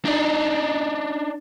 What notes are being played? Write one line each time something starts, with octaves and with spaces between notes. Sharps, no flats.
D4 D#4